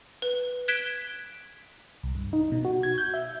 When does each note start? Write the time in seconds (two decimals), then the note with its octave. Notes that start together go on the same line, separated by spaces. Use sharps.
0.22 B4
0.68 F#6 G#6 B6 D7 E7 G7
2.03 C2
2.15 G2
2.33 D#4
2.52 B2
2.65 F#4
2.83 G#6
2.98 G6
3.14 E5